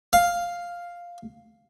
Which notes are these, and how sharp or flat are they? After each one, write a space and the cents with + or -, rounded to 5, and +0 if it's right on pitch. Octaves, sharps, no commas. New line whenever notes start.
F5 +0